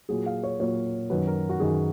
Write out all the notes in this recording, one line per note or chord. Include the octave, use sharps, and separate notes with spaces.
A#2 F#3 A#3 G#4
F5
C#5
A#2 F#3 A#3 C#5
F#2 D#3 F#3 B4
A#4
F#4
F#2 D#3 F#3 G#4